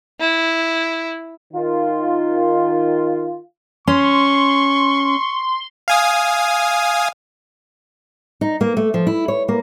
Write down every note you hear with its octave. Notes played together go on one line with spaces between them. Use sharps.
E4
D#3 F4
C#4 C6 C#6
F5 G#5 D#6
D#4
A#3
A3
F3
E4
C#5
A#3